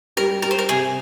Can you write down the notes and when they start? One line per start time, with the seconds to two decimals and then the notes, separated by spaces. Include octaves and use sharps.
0.17 G3 A#4
0.42 G3 A#4
0.51 C5
0.59 A#4
0.69 C3 G#4